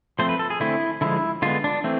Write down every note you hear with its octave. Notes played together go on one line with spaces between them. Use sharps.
F3 A3 C4 C5
B4
A4
G#4
D3 A3 C4 E4
D3 F3 G#3 E4
D3 G#3 B3 F4
D4
E3 A3 C4